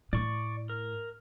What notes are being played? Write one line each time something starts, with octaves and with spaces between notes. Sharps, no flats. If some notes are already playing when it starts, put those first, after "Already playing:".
A2 D5 C#6
A#4